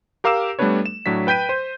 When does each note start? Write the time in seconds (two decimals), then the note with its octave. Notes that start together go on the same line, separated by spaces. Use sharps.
0.24 G4 A#4 F5 D6 E6 E7
0.59 G3 A3 B3 D4 B4 C#5
0.86 E7
1.06 A2 F#3 D4 B6
1.27 B4 G5 G6 B6 D#7
1.49 C5